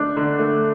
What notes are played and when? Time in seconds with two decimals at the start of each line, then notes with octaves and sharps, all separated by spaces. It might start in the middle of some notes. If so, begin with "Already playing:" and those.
Already playing: D3 A3 D4
0.17 D3
0.39 A3